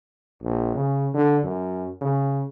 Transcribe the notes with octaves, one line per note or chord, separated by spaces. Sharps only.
A#1
C#3
D3
F#2
C#3